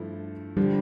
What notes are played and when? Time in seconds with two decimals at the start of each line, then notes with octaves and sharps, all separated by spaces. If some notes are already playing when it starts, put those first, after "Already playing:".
Already playing: G2 F3 A3 E4 A4
0.57 D3 F3 G3